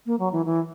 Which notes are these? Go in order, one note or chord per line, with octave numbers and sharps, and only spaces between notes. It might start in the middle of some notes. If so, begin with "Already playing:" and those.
A#3
F#3
E3
E3